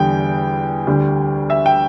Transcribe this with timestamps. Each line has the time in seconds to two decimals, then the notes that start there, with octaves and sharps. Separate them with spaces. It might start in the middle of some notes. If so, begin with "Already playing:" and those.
Already playing: E2 D3 G3 G5
0.86 D2 D3 G3
1.50 E5
1.66 G5